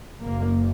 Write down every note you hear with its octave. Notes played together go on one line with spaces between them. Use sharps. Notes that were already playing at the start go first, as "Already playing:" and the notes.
F#1 F#2 A#3